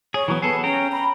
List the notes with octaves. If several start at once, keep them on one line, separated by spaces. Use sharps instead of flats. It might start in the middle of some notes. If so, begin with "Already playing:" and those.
G#4 C#5
E3 F#3 B3
B3 G#4 A4
C#4 G5 A#5
B5